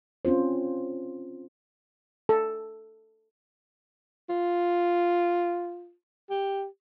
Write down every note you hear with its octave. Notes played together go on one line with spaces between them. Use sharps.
C4 C#4 F4 C5
A4
F4
G4